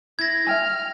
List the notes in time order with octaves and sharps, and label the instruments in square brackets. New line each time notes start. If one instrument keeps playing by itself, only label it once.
[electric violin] E4 [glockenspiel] G#6 A#6
[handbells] E5 G5 G#5 [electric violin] F6